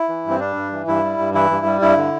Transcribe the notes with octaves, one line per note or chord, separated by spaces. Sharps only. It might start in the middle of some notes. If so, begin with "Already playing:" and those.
Already playing: E4
E3
G2
C4
G3 D4
G2
E3
G2 E4
G3
G2
E3 E4
G2
G3
G2 E4
D3